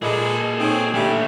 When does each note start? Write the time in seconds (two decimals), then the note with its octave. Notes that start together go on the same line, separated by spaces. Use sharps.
0.02 A#2 G#3 G#4 A4 B4
0.59 C4 D#4 C#5
0.94 D3 G3 A3 C#4